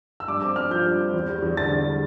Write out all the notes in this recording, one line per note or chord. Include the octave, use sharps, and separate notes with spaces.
E6
G2 D6
C4 D6
G2 F6
F3 G6
G2
C4
E2
G3
E2
D3 A6
E2
G3